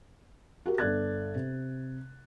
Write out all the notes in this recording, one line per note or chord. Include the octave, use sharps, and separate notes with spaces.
F#4 G4 A#4
G1 A4 D5 F#6 G#6 A6
C3